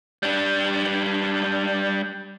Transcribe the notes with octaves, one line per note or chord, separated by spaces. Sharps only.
G3 D4